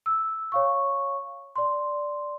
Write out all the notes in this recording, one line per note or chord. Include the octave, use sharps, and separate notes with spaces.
E6
C#5 F5 C#6
D5 C6